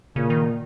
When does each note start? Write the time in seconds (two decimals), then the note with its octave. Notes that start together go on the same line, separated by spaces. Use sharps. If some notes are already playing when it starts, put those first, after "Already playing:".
0.16 A#2 C#3
0.30 D#3